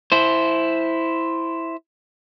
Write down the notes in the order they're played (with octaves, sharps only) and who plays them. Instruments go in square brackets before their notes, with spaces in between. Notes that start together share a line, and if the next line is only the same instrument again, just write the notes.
[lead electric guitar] E4 C5